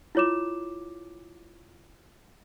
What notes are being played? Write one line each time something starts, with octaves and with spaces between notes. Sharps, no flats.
E4 F4 C#5 D6 E7